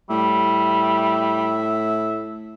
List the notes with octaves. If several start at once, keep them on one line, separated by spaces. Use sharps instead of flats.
A2 G3 E5